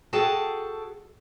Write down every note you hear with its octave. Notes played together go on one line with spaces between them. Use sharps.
F#4 G#4 A4 G5 A5